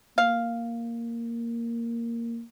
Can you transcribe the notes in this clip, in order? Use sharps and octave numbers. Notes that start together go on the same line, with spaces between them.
A#3 F5